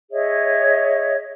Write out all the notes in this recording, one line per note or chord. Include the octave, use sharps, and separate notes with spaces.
G#4 C#5 D#5 E5